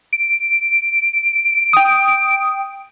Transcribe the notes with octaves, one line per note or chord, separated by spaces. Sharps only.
D7
G5 D#6